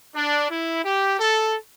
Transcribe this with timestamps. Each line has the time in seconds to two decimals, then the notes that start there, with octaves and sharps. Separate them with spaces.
0.15 D4
0.49 E4
0.83 G4
1.19 A4